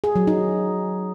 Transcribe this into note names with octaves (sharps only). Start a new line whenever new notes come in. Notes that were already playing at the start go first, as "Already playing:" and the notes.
G#4
F#3
D#4